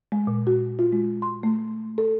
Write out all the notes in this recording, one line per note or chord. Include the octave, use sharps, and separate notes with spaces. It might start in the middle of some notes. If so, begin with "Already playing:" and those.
G#3
A#2
F#4
F4
G#3
C6
A3
A4